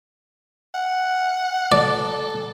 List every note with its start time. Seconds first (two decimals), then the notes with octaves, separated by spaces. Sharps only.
0.75 F#5
1.72 A4 D5